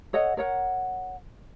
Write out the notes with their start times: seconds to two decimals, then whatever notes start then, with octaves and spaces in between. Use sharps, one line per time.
0.13 A4 C#5 D#5 F#5
0.37 A#4 C#5 F#5